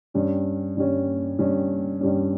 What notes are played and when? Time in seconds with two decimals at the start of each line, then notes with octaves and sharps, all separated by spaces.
0.14 G2 G3 C#4
0.77 G2 G3 C#4
1.39 G2 G3 C#4
2.01 G2 G3 C#4